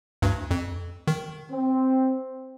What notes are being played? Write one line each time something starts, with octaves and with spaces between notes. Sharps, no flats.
D2 G2
F2
D#3
C4